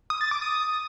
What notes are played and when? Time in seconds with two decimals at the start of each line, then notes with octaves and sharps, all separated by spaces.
0.10 D#6
0.21 A6
0.31 D6
0.42 D#6